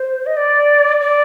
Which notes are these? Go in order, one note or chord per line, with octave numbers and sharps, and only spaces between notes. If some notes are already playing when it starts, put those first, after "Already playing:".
Already playing: C5
D#5
D5
D5